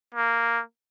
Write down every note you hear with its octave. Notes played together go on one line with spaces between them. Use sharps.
A#3